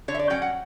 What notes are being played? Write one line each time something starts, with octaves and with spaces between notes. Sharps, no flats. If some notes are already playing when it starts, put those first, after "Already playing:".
D3 C#5
E5
D5
F#3 C#4 G5
F#5